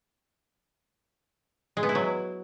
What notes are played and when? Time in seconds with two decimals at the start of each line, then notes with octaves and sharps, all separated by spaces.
1.77 G#3
1.83 B3
1.89 E4
1.95 F#3